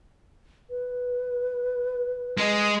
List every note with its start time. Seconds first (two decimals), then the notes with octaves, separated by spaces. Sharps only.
0.70 B4
2.38 G#3